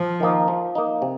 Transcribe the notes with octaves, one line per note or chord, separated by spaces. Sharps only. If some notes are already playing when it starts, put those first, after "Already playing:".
Already playing: F3
D#3 A#3 D#4
F3
A#3 D#4
C3